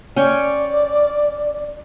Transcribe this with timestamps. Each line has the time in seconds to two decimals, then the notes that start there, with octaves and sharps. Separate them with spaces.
0.16 C#4 D5 G5 C#6